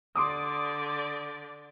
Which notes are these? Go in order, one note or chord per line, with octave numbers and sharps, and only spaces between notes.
D3 D5 C6 D6 D#6